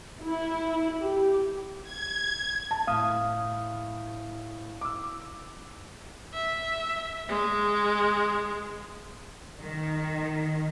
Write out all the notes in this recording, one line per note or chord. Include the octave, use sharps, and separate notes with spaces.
E4
G4
G#6
A5
A2 F5 D#6
D6 E6
E5
G#3
D#3